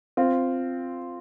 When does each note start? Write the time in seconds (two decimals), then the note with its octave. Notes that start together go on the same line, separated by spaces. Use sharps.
0.17 C4 F4